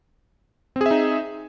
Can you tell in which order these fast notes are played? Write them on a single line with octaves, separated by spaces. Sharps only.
C4 G#4 E5 D#4